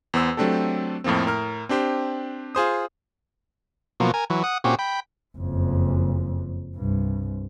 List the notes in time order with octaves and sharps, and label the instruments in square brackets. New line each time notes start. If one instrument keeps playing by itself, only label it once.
[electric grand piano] E2 B3 C5 E6
F#3 A3 C4 D4 G4 A4
F2 A2 F3 A#3 C4
A2 A#4 F6
C4 D4 G4 C5
F4 G#4 C5 D#6
[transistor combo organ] B2 F3 F#3 A#3
A#4 G#5
E3 F#3
F#5 D#6
A#2 C4 C#4 F#4 G4
G5 B5
[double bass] F#1 F2
C2 G2